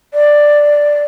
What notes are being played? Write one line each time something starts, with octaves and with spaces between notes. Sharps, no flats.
D5